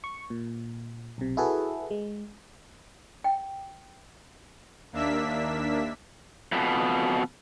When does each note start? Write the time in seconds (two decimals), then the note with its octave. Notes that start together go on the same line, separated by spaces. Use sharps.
0.04 C#6
0.30 A#2
1.18 B1 C3
1.37 E4 F#4 G#4 A4 B4
1.91 G#3
3.24 G5
4.92 D#2 A#3 D4 E5 E6 B6
6.52 F2 B2